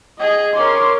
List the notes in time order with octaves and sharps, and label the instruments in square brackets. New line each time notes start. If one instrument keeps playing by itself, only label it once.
[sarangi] G#4 [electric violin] D#5
[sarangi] C#4 [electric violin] A#4 C6 [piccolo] D6